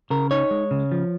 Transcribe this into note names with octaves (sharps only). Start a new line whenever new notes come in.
C#3 A#4
D#4 C#5
G#3
C#3
F3